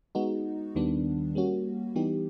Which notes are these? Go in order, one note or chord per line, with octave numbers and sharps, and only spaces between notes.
G#3 B3 D#4 F#4
D#2 D#3 G3 B3 D4
G3 A#3 C#4 F#4
E3 G3 B3 D#4 G4